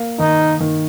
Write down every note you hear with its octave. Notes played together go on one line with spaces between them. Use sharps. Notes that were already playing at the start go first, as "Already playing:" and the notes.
Already playing: A#3
D#3 D#4
D#3